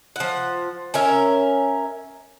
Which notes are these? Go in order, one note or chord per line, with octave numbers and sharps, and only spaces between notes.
F3 F#5
C#4 A#4 E5